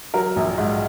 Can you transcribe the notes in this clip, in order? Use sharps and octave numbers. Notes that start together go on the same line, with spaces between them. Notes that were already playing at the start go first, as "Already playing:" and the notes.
F#3 A#4
A#1
G#2